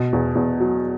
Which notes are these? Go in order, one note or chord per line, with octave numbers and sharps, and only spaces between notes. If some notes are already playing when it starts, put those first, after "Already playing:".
Already playing: B2
E2
E2
F#3